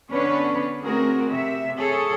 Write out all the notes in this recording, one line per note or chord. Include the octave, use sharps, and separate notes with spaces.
D3 B3 C#4 D4 B4 C#5
A3 C4 F#4 G#4 A#4
C3 E5
G#4 A4 C#5